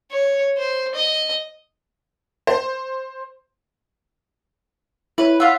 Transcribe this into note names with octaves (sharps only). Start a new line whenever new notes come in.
C#5
C5
D#5
C5
E4 B4 C#5
F4 E5 F#5 F6